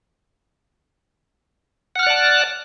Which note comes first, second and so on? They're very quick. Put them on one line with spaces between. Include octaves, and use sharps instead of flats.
F#5 F6 F#6 D5 A5